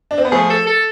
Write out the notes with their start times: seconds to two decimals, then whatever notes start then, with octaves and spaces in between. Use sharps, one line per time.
0.11 D4
0.18 C4
0.25 B3
0.32 F3 A3 G#4
0.50 A4
0.67 A4